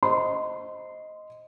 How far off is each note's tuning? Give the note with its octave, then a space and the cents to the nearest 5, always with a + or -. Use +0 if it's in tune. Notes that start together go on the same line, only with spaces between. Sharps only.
C5 +0 D#5 +0 C6 -20